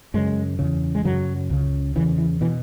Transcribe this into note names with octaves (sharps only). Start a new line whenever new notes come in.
F#2 C#3 G#3
E2 C#3
G#3
F#2 C#3 F#3
C#2 C#3
E2 C#3 E3
E3
B2 E3